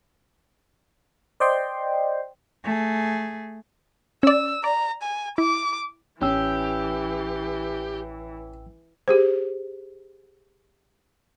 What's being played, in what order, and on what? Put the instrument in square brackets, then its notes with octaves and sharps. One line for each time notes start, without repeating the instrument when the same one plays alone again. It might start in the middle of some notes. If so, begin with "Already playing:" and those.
[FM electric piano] C5 D5 D#5 G5 C6
[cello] A3 G#4
[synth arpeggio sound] C#4 D5 [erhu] E6
[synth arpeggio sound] D5 [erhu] A#5
[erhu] G#5
[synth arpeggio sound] E4 [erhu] D6
[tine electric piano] A1 G5 E6 [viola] E3 [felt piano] C#4 [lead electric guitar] G4
[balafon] G4 G#4 C5